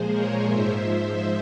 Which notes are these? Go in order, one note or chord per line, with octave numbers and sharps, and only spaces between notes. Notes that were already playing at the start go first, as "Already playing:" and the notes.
Already playing: A#2 F3 G#3 G#4 C5
A#4 C#5
G#2 F3 G#3 C5 E5